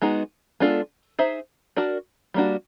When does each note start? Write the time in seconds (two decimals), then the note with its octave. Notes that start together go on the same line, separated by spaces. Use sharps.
0.01 G#3 B3 D#4 F#4
0.60 G#3 B3 D4 F4 A4
1.19 D#4 G#4 C5 E5
1.76 D4 F#4 A#4 D5
2.34 G3 A#3 D4 F#4